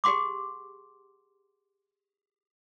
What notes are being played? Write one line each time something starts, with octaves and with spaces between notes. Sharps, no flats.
G4 G#4 F#5 C6 D6